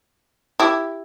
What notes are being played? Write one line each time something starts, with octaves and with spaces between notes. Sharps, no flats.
E4 G4